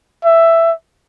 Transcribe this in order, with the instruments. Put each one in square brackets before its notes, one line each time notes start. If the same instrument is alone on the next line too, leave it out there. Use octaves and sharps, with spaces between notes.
[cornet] E5